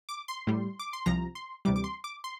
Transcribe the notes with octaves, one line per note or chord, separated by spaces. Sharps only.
D6
C6
A2 G3
D6
C6
C2 C3 F3 A#5
C6
D2 C3 E3 G3 D6
D6
C6
D6
C6